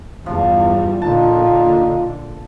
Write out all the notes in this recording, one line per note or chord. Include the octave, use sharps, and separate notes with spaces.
E2 G2 F3 G3
A#2 D3 D#4 F4 A5